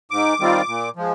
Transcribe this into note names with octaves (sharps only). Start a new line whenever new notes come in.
G#2 D6
D#3 G3 C4 F4
A#2
F3 G#3